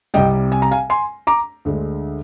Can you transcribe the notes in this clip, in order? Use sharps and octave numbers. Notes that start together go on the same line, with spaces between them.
C2 C3 G3 D#5 G5
G#5
A#5
F5 G#5
G#5 C6
A#5 D6
D2 D3 G#3